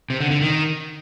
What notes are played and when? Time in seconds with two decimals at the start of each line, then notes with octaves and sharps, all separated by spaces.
0.10 C3
0.20 D3
0.31 D3
0.42 D#3